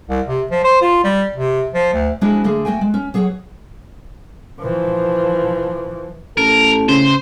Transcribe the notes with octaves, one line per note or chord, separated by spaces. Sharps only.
C2
C3
F3
C5
F4
G3
C3
F3
D2
F3 G#3 D4 E4 F#4 G#4
D3 A3 A#3 G#4
A3 F#4 G5 G#5
G#3
C#4
F#3 G#4 C#5 F#5
E3 F3
A1 A4 A#4
C#3 C5